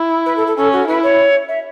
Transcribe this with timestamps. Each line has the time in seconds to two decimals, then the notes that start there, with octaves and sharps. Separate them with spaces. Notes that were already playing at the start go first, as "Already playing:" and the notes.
Already playing: E4
0.26 B4
0.36 A4
0.47 A4
0.57 C#4 A4
0.72 F#4
0.87 E4 B4
1.03 C#5
1.48 E5